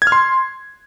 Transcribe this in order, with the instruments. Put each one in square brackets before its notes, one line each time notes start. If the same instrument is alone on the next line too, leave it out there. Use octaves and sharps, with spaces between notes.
[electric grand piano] G#6
F6
C6